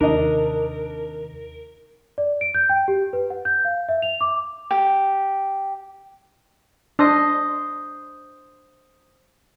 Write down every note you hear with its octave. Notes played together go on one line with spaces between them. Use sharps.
D#2 C3 D4 D#4 A#4 D#5
D5
D7
G6
G5
G4
B4
F#5
G6
F5
E5
F7
D6
G4
D4 C5 D#5